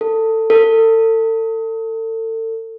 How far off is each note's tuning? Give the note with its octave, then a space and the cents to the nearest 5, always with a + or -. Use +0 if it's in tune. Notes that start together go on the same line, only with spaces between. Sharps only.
A4 +20
A4 +35